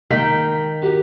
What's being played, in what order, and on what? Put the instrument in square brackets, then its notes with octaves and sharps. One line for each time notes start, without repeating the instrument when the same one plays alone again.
[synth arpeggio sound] C3 G#3 A#3 [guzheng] D#3 G5 [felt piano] B6
[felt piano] F#4 A#4 [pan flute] G4